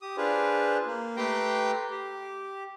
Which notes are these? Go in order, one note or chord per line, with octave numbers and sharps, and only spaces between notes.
G4 D#6
D4 F4 G#4 B4 C5
A#3
A3 G4 B4 G5 A#5 C6
G4